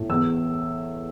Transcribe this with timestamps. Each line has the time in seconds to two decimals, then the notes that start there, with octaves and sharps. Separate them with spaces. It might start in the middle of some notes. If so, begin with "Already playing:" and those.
Already playing: A2
0.09 E2 E6